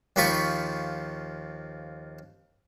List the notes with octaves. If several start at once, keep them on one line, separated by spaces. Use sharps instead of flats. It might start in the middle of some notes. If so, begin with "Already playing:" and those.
D#2 F3 F4 B5 C#6